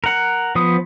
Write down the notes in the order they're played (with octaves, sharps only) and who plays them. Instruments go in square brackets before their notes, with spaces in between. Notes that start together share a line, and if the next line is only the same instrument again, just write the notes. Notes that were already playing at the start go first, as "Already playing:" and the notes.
[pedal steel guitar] A#4 F#5
F3 B3 D#6